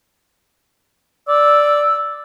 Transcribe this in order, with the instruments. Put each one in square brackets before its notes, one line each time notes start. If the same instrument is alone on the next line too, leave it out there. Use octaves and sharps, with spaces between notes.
[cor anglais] D5 [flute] E6